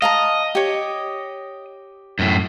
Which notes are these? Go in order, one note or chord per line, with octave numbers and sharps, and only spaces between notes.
D#5 F5 A5 A#5
G4 C#5
F#2 A2